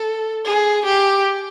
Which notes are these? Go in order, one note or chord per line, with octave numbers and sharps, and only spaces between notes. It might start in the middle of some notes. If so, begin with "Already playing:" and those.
Already playing: A4
G#4
G4